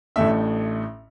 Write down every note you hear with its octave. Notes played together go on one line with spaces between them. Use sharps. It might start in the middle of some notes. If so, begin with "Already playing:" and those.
A1 A2 A3 D4 E5